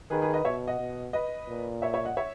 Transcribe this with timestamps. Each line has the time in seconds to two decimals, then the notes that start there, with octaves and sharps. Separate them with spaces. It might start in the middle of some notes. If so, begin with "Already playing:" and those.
0.10 D#3 G#4 B4
0.22 G#4 B4
0.33 B4 D#5
0.45 B2 C#5 E5
0.67 D#5 F#5
0.79 B2
1.13 B4 D#5
1.47 A#2
1.82 C#5 E5
1.94 C#5 E5
2.05 D#5 F#5
2.17 C#5 E5